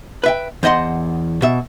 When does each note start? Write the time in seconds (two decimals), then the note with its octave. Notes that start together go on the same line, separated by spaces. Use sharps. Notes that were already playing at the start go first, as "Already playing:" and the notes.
0.24 B4 E5 G5
0.63 E2 C5 D#5 F#5 C6
1.42 B2 E5